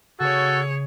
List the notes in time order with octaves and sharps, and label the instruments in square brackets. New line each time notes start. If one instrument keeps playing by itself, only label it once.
[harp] C#3 [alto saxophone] F#4 [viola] G#4 C#5 [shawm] A4